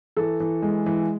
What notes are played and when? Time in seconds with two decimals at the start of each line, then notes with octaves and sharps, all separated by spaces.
0.17 E3 A4
0.40 E3
0.62 G#3
0.86 E3